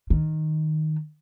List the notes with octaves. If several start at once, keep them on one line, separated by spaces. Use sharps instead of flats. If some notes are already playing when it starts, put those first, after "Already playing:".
D#3